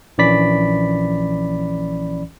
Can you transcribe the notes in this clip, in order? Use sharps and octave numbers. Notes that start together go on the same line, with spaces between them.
A#1 E3 C#4 D5 B5 B6